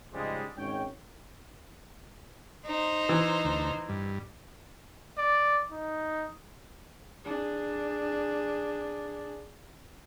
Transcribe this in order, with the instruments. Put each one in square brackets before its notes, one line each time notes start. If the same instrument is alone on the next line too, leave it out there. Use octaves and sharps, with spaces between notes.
[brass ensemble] G#2 C#3 F3 G3 G#3
G#1 G#2 C#4 C#5 G5
[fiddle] D#4 C5
[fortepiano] E3
[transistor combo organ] D2
G2
[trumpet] D5
D#4
[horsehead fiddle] D4 G#4